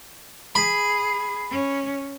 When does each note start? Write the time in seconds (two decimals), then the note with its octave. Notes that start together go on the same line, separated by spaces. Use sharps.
0.55 G#4 B5
1.51 C#4